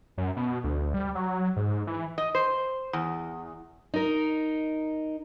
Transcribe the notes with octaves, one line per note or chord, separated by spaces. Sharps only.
F#2
B2
D2
G3
F#3
G#2
E3
D#5
C5
E2
D#4 A#4